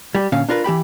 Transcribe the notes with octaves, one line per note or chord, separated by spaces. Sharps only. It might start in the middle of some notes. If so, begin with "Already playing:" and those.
G3 G4
A#2 D3 C#4 F5
D4 F4 A#4 B4
E3 G4 G5 B5